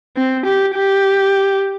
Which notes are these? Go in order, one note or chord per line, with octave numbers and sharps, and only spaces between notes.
C4
G4
G4